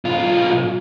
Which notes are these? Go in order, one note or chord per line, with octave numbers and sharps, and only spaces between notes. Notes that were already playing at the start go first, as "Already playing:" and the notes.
B1 F4